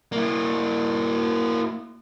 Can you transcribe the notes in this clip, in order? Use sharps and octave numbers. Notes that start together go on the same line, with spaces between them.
A#3 E4